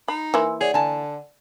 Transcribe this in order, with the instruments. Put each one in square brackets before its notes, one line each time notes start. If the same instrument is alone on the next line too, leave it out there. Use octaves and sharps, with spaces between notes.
[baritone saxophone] D#4 [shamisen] B5
[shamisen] E3 A#3 E4 [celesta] G#5 C6 E6
[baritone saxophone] G#4 [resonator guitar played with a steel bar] C#5 [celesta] D5 F#5
[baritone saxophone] D3 [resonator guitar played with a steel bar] G#5 A5